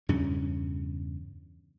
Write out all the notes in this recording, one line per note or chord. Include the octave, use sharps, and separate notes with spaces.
E2 G2 C#3 C#4